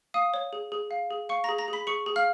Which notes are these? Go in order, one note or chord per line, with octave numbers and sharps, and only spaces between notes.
F5 D#6 D#7
C#5
G#4
G#4
F5
G#4
F5 C#6 C#7
G#4 A#5 A#6
A#5 A#6
G#4
B5 B6
G#4 C#6 C#7
G#4
F5 F6